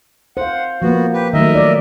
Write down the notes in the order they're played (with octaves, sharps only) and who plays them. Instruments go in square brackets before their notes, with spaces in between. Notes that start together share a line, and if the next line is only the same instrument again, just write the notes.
[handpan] C5 F5 [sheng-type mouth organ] F#5
[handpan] F3 A#3 [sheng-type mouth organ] B3 F#4
[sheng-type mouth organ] G4 B4
[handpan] D#3 F#3 A3 [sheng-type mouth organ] A#4 D#5 E5
[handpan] D5